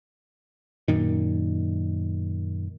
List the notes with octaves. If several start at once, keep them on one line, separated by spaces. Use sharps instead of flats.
F#2 A#2 D#3